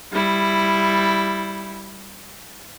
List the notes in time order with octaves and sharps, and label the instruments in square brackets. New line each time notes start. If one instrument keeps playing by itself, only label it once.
[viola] G3 E4